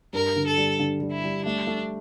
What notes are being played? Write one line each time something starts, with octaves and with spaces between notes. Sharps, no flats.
G2 A#4
D3
A4
G3
D3
G3
E4
G3
A3 D4
A3